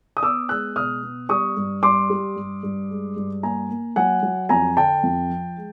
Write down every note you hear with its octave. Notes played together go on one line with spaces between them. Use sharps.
D#6
B3 D6 E6
G#3 E6 F#6
B2 D#6 F6
B3
G3 C#6 D#6
G2
G2 C6 D6
G3
G2
G2
G#3
G2
A#3 G#5 A#5
A#3
F#3 F#5 G#5
F#3
F2 G#5 A#5
D3 G5 A5
F2
F3
G#3